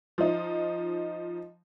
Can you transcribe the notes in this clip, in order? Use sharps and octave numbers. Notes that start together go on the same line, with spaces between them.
F3 D#4